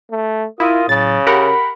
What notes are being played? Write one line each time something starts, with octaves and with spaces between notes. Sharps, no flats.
A3
E4 F4 A#4 D#6
A2 C#3 F#3 A6
G4 A#4 F#5 B5